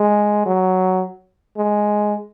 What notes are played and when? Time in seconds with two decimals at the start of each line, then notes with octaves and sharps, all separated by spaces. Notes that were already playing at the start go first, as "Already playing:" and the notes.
Already playing: G#3
0.46 F#3
1.57 G#3